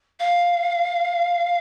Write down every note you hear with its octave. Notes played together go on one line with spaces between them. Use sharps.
F5